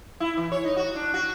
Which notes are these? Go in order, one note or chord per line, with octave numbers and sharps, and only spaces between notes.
E4
E3
C#5
D#4
F#4
D4
F#4